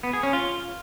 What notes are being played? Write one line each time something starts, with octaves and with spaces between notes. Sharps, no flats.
B3
G#4
C#4
F4